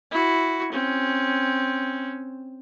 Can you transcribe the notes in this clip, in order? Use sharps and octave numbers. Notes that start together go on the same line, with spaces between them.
E4 F#4
C4 C#4